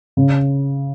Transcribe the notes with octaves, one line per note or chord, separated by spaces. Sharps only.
C#3